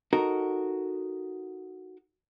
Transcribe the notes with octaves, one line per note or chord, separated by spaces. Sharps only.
D#4 F#4 A4 A#4